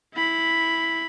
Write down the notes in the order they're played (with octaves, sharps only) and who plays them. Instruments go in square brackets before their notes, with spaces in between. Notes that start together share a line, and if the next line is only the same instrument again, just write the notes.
[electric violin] E4 B5